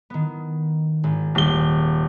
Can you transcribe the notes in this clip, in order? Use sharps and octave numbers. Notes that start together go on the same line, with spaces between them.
D#3 B3
G#1
D#1 D#3 A#3 G7